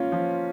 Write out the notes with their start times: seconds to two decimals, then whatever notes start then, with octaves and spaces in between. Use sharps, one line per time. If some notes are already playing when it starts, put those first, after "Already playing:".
Already playing: A#3 C#4 F4
0.12 F3